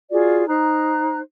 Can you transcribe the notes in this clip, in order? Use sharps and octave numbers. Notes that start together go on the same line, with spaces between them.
F4 F#4 G#4 D5
D#4 C5 A#5 F#6